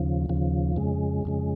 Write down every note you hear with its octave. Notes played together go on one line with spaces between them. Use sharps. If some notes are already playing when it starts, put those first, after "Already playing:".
Already playing: D#2 C#3 F3
D#2 C#3 F3
F2 C#3 G#3
F2 C#3 G#3